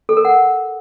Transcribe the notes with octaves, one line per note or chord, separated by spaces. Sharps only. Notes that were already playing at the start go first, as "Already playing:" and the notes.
A4
A#4
F#5